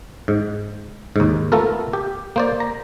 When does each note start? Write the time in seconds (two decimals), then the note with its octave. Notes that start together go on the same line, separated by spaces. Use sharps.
0.28 G#2
1.16 D#2 G#2
1.52 A3 B3 F4 A4 A#4
1.93 G4
2.36 A#3 C5 D5
2.60 A#5